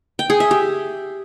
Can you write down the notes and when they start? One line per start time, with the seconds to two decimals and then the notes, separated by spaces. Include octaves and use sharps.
0.19 G5
0.30 G#4
0.40 E5
0.51 G4